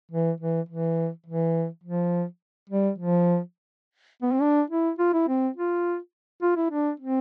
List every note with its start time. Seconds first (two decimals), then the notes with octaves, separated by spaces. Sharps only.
0.12 E3
0.41 E3
0.69 E3
1.26 E3
1.84 F3
2.70 G3
2.98 F3
4.22 B3
4.32 C4
4.42 D4
4.70 E4
4.99 F4
5.13 E4
5.28 C4
5.57 F4
6.42 F4
6.57 E4
6.71 D4
7.00 C4